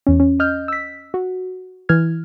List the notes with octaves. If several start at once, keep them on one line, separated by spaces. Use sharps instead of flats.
E2 C#4
C#4
D#5 F6 G6
E6 B6
F#4
E3 F6 G#6